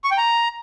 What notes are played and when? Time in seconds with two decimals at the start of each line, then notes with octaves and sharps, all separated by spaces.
0.04 C#6
0.11 G5
0.18 A#5